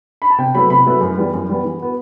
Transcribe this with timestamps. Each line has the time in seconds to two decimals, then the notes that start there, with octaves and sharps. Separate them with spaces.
0.22 B5
0.30 A5
0.38 C3 G5
0.55 F#3 A3 E4 B4 B5
0.70 C3 B5
0.86 F#3 A3 E4 B4
1.01 F#2
1.17 E3 G3 B3
1.33 F#2
1.49 E3 G3 B3
1.64 E3
1.80 B3 F#4